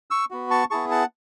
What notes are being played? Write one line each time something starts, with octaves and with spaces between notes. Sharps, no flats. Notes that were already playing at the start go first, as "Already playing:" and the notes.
C#6 E6
B3 F#4
A5 C#6
B3 E4 G#4 A5 C#6
F#5 A5